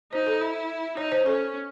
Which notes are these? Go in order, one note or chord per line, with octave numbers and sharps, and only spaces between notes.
D#4 C5
A4
E4
D#4 C#5
C5
C#4 A4